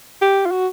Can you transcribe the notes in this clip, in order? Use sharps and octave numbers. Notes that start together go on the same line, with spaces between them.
G4
F4
F#4